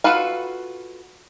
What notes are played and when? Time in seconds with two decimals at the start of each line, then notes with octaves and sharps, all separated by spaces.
0.04 F4 F#4 A4 B4 F5